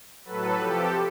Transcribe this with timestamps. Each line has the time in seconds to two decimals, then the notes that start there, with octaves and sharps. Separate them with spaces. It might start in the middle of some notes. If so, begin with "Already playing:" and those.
0.25 A2 F#3 A4 B4
0.58 C3 F3 G4 A4